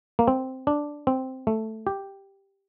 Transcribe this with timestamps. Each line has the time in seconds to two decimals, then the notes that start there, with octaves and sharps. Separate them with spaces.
0.19 A#3
0.28 C4
0.67 D4
1.07 C4
1.47 A3
1.87 G4